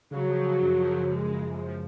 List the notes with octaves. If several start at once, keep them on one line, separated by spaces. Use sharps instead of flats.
C#3 F#3
F3
C#3
F#2
F3
F#2
F#2 G#3
C#3
F#2
F3